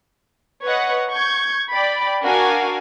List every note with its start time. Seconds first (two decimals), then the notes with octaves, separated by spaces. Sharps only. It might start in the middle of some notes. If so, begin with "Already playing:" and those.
0.65 B4 C#5 D#5 F#5
1.12 C#6 G6 G#6
1.72 D5 G5 B5
2.22 D4 F#4 A#4 F5 G#5